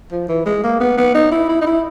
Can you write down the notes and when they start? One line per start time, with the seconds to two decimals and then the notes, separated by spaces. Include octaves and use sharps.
0.12 F3
0.28 E3
0.46 G#3
0.63 A#3
0.80 B3
0.97 B3
1.14 D#4
1.31 E4
1.49 E4
1.61 D#4
1.66 E4